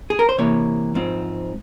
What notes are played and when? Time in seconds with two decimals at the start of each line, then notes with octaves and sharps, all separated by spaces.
0.10 G#4
0.19 A#4
0.29 C5
0.38 C3 E3 A#3 C#5
0.95 G#2 F3 C4